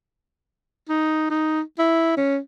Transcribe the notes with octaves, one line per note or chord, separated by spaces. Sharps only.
D#4
D#4
E4
C#4